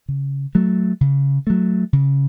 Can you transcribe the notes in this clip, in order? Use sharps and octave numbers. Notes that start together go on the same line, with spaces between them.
C#3
F#3 A3
C#3
F#3 A3
C#3